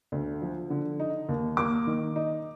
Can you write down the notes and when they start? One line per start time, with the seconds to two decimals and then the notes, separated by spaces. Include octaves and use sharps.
0.12 D2
0.42 F3
0.70 D3
0.99 D#4
1.29 D#2
1.57 A#3 D6
1.87 D#3
2.16 D#4